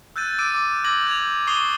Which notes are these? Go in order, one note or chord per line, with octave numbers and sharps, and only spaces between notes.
E6 F#6 G6 A6 D#7
D6 E6 D7 D#7
D6
D6 E6 G#6 A#6 F#7
G6 G#6 F7
C#6 D#6 C7 D#7 F7 G7